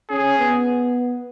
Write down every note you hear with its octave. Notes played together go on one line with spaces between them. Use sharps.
C#4 G#4
B3